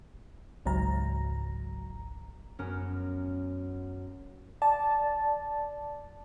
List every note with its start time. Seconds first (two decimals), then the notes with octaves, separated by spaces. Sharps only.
0.66 G#1 C#2 G#2 F#3 A#5
2.59 F#2 B3 C#4 A#4
4.62 D5 A5